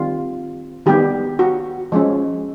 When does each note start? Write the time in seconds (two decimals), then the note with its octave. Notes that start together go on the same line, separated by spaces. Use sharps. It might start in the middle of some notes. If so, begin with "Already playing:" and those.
Already playing: D#3 G3 C4 F4
0.86 D#3 G3 B3 G4
1.39 F#4
1.92 F3 G#3 C#4